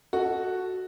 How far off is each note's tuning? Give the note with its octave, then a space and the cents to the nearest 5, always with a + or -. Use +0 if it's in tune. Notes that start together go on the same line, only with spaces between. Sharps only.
F#4 +0 A4 +0 D#5 +0